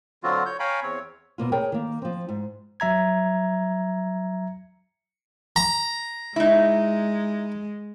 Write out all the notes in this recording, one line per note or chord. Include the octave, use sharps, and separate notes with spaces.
D3 F#3 C4 F4 F#4
C#5 G6
C#5 F5 G5 G#5 A#5 B5
E2 C4 C#5
B2 A#3 F4
G#4 A#4 C#5 G5
D#3 A#3
F3 C4
G#2
F#3 E5 A#5 G#6
A#5
G#3 D#4 E4